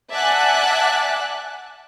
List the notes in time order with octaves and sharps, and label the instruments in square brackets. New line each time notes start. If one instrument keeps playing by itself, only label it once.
[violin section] D5 E5 F#5 G#5 A5 F#6